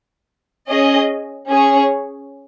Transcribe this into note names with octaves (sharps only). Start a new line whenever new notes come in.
C#4 G#4 D#5
C#4 G#4 C#5